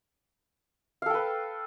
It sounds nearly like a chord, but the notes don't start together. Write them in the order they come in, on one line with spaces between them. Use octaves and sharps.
F5 A4 G5 B4